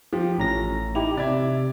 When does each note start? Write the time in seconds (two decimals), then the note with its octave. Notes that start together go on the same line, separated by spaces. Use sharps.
0.13 F3 G4
0.38 A1 A2 C#4 A#5 A#6
0.95 D#4 E4 G4 F7
1.17 C3 D5 E5 G#6